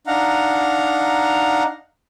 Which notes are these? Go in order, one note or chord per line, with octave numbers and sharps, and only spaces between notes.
D4 D#4 F5 F#5 A#5